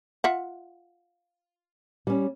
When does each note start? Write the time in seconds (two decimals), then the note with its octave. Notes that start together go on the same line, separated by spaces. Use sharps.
0.24 F4 E5 F#5
2.07 G3 C#4